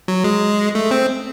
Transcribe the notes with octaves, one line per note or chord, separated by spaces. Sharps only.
F#3
G#3
A3
C4